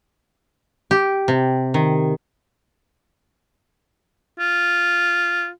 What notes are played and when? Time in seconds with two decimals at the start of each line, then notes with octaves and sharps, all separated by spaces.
0.91 G4
1.28 C3
1.74 D#3
4.40 F4